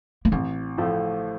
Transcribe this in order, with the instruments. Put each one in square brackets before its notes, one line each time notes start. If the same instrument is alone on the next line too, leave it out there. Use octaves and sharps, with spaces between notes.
[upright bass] A#3
[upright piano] A1 [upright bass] C4
[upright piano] A2 F3 A3